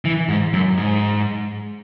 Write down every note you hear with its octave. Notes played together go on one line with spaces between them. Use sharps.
E3
G#2
F#2
G#2